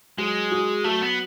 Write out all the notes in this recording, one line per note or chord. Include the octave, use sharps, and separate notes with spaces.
F#3 G#3
F#4
F#3 A3
B3